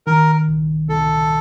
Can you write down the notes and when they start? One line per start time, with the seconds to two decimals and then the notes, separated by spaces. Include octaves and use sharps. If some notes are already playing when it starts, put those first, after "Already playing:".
0.07 D#3 A#4
0.48 C2
0.89 C2 A4